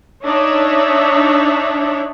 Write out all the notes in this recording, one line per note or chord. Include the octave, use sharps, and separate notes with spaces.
D4 D#4 C#5 E5